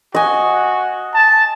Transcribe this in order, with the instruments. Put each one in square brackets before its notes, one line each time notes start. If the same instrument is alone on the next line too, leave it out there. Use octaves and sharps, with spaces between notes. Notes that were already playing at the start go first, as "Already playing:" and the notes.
[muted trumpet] F#4 [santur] D#5 G#5
[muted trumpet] A5